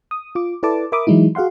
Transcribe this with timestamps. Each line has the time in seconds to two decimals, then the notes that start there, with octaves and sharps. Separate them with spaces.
0.11 D#6
0.35 F4 D6
0.63 E4 A4 B4 D5 A5 D6
0.92 A#4 E5 B5 D6 D#6
1.07 E3 F#3 G#3 D#4 E4
1.35 F#4 G#4 F5 F#5 C6